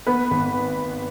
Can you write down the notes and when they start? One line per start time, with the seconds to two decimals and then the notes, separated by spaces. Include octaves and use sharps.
0.07 B3 B4
0.31 G#1